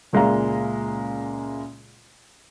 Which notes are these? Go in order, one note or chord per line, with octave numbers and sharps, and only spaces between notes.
C#2 A#2 G#3 E5 F5 A#5